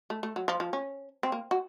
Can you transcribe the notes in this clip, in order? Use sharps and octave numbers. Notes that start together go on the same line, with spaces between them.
A3
A3
F#3
F3
F3
C#4
C4
A#3
F#4